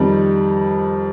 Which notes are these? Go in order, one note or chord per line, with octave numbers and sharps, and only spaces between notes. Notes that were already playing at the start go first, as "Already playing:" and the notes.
Already playing: F2 D#3 G3